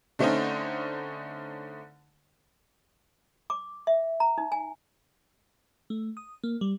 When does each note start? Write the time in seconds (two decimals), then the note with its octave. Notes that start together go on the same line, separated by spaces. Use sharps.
0.19 D3 A3 C4 C#4 D#4
3.50 D6
3.87 E5
4.20 A#5
4.38 D#4
4.52 G#5
5.90 A3
6.17 D#6
6.44 A#3
6.61 G3